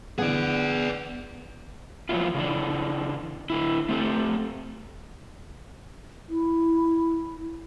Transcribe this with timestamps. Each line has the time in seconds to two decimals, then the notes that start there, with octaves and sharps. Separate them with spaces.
0.18 D3 E3 B3 G#4 D5 F#5
2.09 F3 F#3 A#3 B3 E4 F4
2.35 C#3 E3 D4
3.50 D3 E4
3.89 A3 C4 G4 A4
6.29 E4